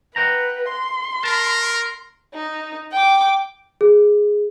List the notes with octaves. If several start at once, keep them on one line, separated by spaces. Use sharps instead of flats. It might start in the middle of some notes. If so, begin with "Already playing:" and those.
B4 F#5 G5 A#5
C6
A#4 A5
D#4
G5 D6
G#4